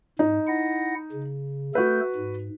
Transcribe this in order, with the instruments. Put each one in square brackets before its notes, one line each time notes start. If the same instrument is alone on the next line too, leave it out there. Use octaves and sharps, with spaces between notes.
[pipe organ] G#2 [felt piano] D#4
[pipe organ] E4 F#5 A#6
C#3
[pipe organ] A3 A4 G6 [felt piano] F#4 B4
[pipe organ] G#2